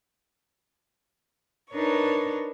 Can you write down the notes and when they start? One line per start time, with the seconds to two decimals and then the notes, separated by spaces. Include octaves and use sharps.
1.72 D4 D#4 A#4 B4 C#5